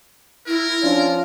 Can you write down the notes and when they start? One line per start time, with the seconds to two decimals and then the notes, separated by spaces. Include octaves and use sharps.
0.47 E4 A#4
0.83 F3 C#4 D4 F4 D5